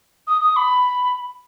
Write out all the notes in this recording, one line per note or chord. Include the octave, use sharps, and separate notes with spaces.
D#6
D#6
B5